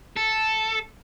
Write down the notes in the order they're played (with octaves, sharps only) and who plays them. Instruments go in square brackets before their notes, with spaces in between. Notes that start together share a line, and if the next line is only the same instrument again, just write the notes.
[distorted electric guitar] A4